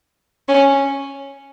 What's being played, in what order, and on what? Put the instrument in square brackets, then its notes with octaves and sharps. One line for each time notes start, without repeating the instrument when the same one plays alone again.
[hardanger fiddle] C#4